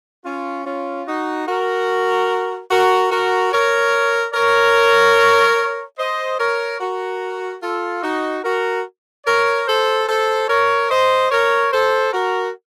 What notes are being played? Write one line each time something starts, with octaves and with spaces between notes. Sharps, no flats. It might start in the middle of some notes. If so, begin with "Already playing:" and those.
C#4 F4
C#4 F4
D#4 F#4
F#4 A#4
F#4 A#4
F#4 A#4
A#4 C#5
A#4 C#5
C5 D#5
A#4 C#5
F#4 A#4
F4 A4
D#4 F#4
F#4 A#4
A#4 C#5
A4 C5
A4 C5
A#4 C#5
C5 D#5
A#4 C#5
A4 C5
F#4 A#4